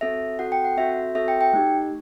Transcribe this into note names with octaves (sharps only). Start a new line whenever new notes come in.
C4 F#4 A4 E5
C4 F#4 A4 F#5
G5
F#5
C4 F#4 A4 E5
C4 F#4 A4 E5
G5
G5
A3 D#4 G4